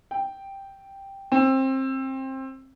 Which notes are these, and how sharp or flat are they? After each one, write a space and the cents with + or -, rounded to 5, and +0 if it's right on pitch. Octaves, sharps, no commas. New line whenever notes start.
G5 +0
C4 +25